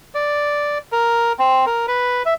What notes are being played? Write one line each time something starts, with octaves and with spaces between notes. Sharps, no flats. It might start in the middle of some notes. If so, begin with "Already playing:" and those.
D5
A#4
C4
A#4
B4
E5